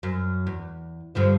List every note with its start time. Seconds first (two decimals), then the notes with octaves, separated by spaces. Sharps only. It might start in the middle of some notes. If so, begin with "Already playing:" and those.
0.03 F#2
0.47 E2
1.15 G2 D3 F3